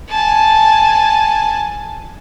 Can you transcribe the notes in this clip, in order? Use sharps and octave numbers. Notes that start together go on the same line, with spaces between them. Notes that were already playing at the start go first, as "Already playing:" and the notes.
G#5 A5